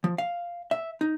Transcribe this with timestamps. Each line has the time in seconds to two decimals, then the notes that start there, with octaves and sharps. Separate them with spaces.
0.04 F3
0.18 F5
0.71 E5
1.01 D#4